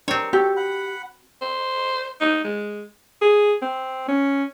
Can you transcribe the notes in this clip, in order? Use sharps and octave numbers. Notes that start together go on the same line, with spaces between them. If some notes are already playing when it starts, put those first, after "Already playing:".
F#3 C4 D4 G4 A#4 C#5
F#4 G4 A4
F#5 B5
C5
D#4
G#3
G#4
C4
C#4